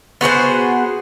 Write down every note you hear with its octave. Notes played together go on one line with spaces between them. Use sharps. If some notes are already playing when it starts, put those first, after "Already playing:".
B3 F#4 G#4 C5